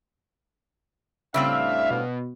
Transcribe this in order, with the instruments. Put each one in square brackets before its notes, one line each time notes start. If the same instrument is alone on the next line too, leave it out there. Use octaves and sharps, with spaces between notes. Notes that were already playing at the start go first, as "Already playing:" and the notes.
[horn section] A2 D4 F5 [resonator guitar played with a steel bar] C#3 G3 C4 [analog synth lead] E5
[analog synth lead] B2